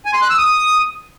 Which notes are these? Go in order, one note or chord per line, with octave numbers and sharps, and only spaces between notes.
G#5
C6
F#6
E6
D#6